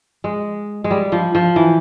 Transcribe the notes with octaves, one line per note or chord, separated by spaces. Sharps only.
G#3
G#3
G3
F3
F3
E3